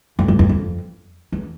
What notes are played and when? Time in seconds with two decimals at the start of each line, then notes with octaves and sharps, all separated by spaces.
0.19 F2
0.28 F#2
0.39 F2
0.49 F2
1.32 E2